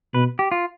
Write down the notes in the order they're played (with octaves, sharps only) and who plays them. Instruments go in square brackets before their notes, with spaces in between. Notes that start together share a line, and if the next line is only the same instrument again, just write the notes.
[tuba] B2 [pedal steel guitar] B4
[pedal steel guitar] G4
F4